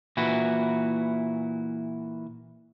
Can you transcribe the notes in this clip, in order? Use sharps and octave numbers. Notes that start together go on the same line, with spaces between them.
A#2 E3 E4 F#4